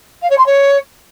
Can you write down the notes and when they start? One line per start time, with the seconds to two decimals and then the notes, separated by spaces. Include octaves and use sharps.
0.21 F5
0.29 C#5
0.37 C6
0.46 C#5